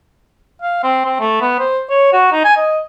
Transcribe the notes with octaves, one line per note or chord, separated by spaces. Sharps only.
F5
C4
C4
A3
B3
C5
C#5
F#4
D#4
G#5
D#5